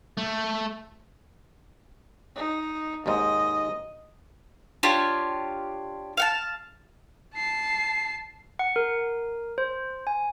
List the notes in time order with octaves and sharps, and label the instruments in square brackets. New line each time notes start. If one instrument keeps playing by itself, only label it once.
[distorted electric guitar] A3
[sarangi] D#4
[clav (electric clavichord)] D#2 G#2 [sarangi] D#5
[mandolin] D4 F4 G4 C#5
F5 F#5 A5
[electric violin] A5 C7
[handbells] F#5
A#4
C5
G#5